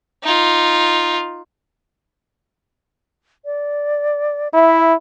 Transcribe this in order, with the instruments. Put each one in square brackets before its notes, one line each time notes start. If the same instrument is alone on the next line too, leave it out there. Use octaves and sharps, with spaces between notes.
[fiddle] D#4 F4
[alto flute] D5
[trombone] E4 [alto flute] E5